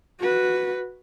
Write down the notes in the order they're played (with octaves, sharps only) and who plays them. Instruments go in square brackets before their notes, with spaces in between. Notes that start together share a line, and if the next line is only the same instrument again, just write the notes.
[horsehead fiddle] F#4 B4